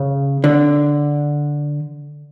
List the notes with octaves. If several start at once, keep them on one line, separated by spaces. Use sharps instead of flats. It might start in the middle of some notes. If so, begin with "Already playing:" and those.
Already playing: C#3
D3